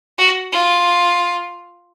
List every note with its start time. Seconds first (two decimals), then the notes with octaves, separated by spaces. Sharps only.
0.18 F#4
0.53 F4